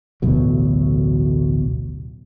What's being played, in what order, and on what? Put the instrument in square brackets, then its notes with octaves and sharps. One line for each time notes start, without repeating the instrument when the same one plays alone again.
[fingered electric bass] A1 D2 B2 F#3